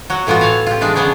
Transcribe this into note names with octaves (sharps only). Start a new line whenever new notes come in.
F#3 F#4
A2 E3 B3 F4 F#4
F#4 C#5 E5 F5
F4 G4
E3 G#3 D4 G#4
C#3 E3 B3 D4 C#5